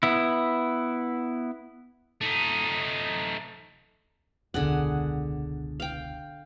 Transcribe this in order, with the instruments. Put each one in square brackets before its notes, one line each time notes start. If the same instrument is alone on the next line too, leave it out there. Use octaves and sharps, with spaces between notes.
[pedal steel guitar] B3 E4
[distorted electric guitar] A3 D#4
[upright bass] E1 C#2 [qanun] D3 G#4 F#5
[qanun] F5 G5